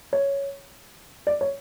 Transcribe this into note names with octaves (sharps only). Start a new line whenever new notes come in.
C#5
D5
C#5